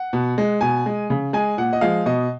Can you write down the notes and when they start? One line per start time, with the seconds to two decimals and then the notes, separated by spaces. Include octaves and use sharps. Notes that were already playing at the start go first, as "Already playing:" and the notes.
Already playing: F#5
0.13 B2
0.38 G#3
0.61 B2 G#5
0.86 G#3
1.10 C#3
1.33 G#3 G#5
1.57 A#2 F#5
1.73 D#5
1.81 F3 G#3 F5
2.06 B2 D#5